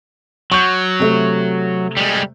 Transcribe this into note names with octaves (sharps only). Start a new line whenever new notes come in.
F#3 C#6 G6
C3 A3
G3 G#3